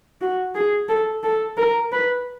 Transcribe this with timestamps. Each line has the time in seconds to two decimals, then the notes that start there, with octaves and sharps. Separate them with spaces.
0.21 F#4
0.55 G#4
0.89 A4
1.23 A4
1.57 A#4
1.92 B4